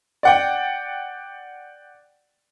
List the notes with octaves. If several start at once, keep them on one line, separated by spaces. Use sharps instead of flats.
D5 F#5 G5